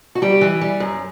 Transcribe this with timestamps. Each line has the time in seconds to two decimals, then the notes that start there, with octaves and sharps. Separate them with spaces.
0.15 F#4
0.22 G3 G4
0.41 E3
0.61 G3
0.80 F#2